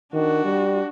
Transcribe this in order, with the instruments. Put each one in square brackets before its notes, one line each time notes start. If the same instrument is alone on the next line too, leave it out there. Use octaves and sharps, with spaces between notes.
[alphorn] D#3 [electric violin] D4 F#4
[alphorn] G3